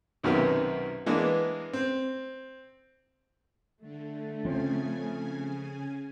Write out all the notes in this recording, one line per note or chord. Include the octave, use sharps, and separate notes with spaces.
B1 F#2 C3 D#3 F#3 B3
E3 G#3 A#3 B3 D4
C4
D3 A3
C#3 F3 C4 C#4 G#5